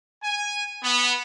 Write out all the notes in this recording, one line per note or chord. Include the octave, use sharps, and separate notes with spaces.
G#5
B3